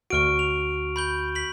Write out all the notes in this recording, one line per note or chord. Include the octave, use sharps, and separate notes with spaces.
D2 F#4 C#6 F6 D7
F7
B5 G6 G7
B6 F#7